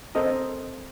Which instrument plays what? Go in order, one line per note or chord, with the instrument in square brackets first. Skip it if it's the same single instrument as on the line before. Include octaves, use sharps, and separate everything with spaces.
[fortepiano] C4 A4 A#4 D#5